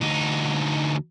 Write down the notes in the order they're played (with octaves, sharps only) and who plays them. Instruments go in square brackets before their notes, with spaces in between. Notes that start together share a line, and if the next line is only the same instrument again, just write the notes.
[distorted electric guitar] D2 D#4